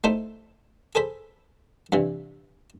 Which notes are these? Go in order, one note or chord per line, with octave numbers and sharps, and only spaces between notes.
A3 D#4 E4 A4 C5
G#4 A4 C5 B5
G2 C3 E3